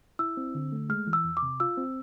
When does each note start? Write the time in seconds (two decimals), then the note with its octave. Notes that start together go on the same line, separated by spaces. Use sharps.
0.19 E4 E6
0.37 C4
0.55 D3
0.72 A3
0.89 G#3 F6
1.07 E3
1.13 E6
1.24 E2
1.37 D6
1.42 C3
1.60 F4 E6
1.77 C4